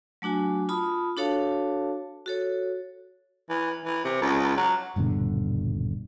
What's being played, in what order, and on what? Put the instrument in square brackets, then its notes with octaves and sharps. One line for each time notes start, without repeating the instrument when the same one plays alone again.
[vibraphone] F#3 A3 D4 F#4 G#5
F4 A5 B5 D#6
D4 F#4 A4 C#5 F5 A5
F#4 A4 C#5
[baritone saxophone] E3
E3
C3
C#2
F#3
[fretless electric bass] D#1 G2 B2 D3